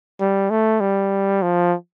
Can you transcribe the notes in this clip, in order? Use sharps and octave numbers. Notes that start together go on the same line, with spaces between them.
G3
A3
G3
F3